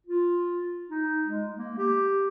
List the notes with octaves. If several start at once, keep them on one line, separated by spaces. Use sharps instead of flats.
F4
D#4
G#3
A#3
G4